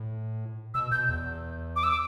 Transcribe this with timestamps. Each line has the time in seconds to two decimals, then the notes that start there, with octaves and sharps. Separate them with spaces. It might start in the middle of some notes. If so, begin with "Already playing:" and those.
Already playing: A2
0.74 B2 E6
0.92 B2 G6
1.09 E2
1.76 D6
1.83 E6
1.91 D6